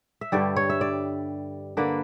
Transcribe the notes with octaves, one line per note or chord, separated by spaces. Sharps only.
E5
G2 D3 G3 D5
C#5
E5
D5
D3 A#3 D4 B4